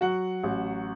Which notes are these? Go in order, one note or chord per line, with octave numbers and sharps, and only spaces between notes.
F#3 F#4 F#5
A1